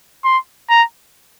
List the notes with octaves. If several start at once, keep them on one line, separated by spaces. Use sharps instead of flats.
C6
A#5